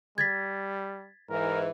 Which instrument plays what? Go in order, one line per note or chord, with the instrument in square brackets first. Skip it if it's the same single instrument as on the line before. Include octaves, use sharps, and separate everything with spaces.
[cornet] G3 [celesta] G#6 A6 B6
[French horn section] G#2 E3 [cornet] A#4